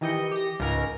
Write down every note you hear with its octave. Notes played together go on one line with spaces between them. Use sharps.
D#3 E3 G4 D#5 G6 C#7
G4 A#6
C#2 G#2 A#4 A#5